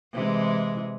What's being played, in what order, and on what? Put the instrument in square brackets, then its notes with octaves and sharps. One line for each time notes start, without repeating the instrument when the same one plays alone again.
[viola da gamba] C3 E3 G#3